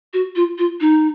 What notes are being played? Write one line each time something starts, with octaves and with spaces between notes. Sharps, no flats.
F#4
F4
F4
D#4